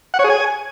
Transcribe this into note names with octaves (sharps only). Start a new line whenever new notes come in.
F#5
C#5
G#4
G#5